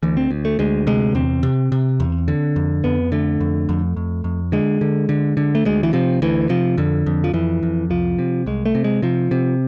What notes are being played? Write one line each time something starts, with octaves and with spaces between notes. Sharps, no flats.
D2 E3
C4
D2
A3
D2 G#3
C3 G#3
E2 C4
C3
C3
E2
D3
F2
F2 B3
D3 A3
F2
F2
F2
F2
D3 G#3
D3
D3
D3
A3
D2 G#3
E3
C3 F3
D2 E3
C3 F3
F2 D3
F2
F3
F2 E3
F2
C2 F3
C3
C2 G#3
A3
C3
G#3
C3 F3
C3